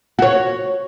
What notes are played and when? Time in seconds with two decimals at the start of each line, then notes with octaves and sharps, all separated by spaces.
0.19 F#4 C#5